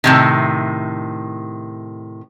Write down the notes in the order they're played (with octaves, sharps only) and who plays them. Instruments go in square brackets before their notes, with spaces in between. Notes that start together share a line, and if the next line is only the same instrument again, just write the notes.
[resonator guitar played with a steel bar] A2 C3 D#3